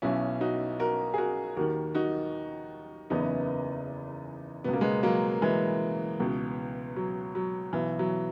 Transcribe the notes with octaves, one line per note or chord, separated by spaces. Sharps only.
B1 B2 C#4 E4
D#4 F#4
F#4 A#4
G#4
F#4 A#4
D#2 D#3 F#4 A#4
D#4 F#4
F#1 E2 C#3 E3 B3 D#4
C#2 B2 B3
A#3
G#3 B3
F#3 A#3
E3 G#3
C#2 B2
F#3
F#3
B1 B2 E3
F#3